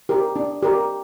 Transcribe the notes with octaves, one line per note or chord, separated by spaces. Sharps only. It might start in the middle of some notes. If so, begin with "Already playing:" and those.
G4 A#4
D4
G4 A#4